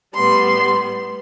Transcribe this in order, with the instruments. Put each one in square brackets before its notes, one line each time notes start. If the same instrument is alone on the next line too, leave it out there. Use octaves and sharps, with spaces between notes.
[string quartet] A2 G3 B3 C6